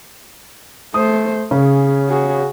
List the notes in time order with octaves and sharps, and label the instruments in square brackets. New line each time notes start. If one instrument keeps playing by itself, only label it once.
[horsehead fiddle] A3 C5 [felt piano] D#6
[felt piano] C#3 [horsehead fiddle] C#4 G#4
[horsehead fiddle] F#4 G#4